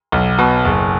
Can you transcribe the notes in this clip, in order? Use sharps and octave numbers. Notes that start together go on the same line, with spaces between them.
B1
B2
F#1